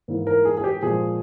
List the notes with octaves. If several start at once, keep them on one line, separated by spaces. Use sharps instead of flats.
G#2 E3 A#3 E4
A#4
G#4
G#4
G4
A#2 F3 G#3 G#4